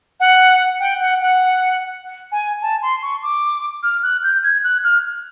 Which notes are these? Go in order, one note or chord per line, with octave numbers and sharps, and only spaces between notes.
F#5
G5
F#5
F#5
G#5
A5
C6
C#6
D6
F6
F#6
G6
G#6
F#6
F6